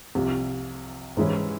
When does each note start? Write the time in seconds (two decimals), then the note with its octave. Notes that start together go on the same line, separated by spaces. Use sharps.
0.15 C2 C3 F3
1.17 G#2 E3 G#3 C#4 E4